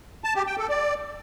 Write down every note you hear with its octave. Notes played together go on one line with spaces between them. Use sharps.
A5
G4
G5
A4
D5